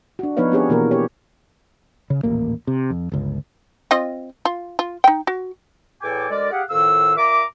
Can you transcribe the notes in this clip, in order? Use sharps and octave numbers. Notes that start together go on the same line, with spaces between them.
D4 F#4
F3 B3 D#4 B4 C#5 F5
B3 C4 D4 G4 G#4 C#5
B2 E3 A#3 F#4 A#4
G4 C#5
C#3
D#1 A1 A#3
C3
F2
G1 C#2
C4 F4 D#5
F4
F4
D#4 G5
F#4
E2 A2 A4 G5 G#5 D6
D2 G#3 A#4 D5
G4 G#4 F5 F#5
F2 A2 D#3 F5 E6
A#2 E5 A#5 D6